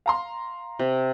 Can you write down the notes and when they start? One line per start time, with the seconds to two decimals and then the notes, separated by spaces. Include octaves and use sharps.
0.06 F5 A#5 C6
0.79 C3